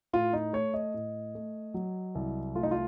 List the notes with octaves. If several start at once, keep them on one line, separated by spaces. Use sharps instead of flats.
A2 F4
D#4
A3 C#5
D#5
A2
A3
F#3
C2
A3 F4
D#4
F4